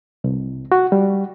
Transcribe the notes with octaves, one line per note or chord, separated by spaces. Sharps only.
C2
F#4
G3